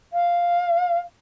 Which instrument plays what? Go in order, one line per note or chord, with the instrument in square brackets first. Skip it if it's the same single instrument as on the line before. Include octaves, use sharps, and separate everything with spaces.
[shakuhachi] F5